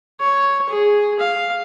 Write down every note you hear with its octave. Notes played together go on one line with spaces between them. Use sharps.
C#5
G#4
F5